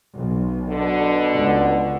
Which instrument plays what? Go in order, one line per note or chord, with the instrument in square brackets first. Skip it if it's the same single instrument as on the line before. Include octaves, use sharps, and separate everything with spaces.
[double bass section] B1
[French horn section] B2 D3
[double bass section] C#2